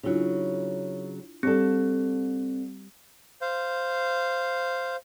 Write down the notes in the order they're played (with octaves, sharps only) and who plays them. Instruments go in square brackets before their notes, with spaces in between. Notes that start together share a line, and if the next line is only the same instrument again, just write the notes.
[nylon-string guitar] C#3 F#3 [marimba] D4 E4 F4
[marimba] G3 G4 [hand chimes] C4 [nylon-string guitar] D4 A4
[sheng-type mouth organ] C5 F5